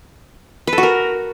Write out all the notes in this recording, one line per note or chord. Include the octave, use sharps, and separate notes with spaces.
B4
A4
F#4
A#4